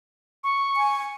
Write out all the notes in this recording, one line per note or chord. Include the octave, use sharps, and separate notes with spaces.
C#6
G#5